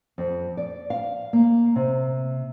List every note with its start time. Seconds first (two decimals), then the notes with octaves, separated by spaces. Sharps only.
0.18 F2
0.57 D5
0.90 F5
1.33 A#3
1.76 C3